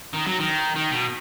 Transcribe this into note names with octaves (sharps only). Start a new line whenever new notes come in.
D#3
F#3
D#3
D#3
B2